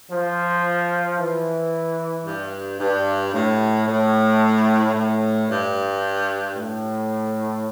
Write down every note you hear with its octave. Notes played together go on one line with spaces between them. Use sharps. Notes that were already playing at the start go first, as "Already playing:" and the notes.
F3
E3
G2
G2
A2
A2
A2
G2
A2